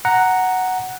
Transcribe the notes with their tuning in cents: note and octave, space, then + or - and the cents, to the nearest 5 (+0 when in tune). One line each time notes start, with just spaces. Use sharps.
F#5 +0 A#5 +0